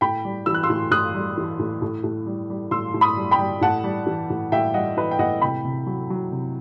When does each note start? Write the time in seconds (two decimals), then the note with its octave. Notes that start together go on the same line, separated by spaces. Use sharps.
0.01 A2 G5 B5
0.25 G3
0.46 E3 E6
0.54 F#6
0.63 C6 E6
0.70 A2
0.91 A2 D#6 F#6
1.14 G3
1.37 E3
1.59 A2
1.82 A2
2.04 A2
2.26 G3
2.50 G3
2.71 A2 C6 E6
2.94 A2
3.01 B5 D#6
3.16 G3
3.31 G5 B5
3.39 G3
3.61 A2 F#5 A5
3.84 G3
4.07 E3
4.30 A2
4.52 A2 E5 G5
4.74 G3 D#5 F#5
4.97 E3 B4 D#5
5.11 G5
5.19 A2 D#5 F#5
5.42 C3 G5 B5
5.65 C3
5.87 F#3
6.10 F#3
6.32 C3